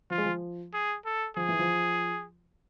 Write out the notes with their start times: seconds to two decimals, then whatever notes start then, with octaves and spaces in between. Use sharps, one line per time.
0.10 F3 F4
0.18 G#3
0.25 F3
0.74 G#4
1.06 A4
1.36 F3 G#4
1.49 E3
1.59 F3